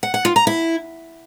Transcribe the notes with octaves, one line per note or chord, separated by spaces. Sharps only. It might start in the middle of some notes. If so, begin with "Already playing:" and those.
F#5
F#5
F4
A#5
E4